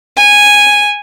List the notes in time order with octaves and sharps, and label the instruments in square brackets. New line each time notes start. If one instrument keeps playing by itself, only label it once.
[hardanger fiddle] G#5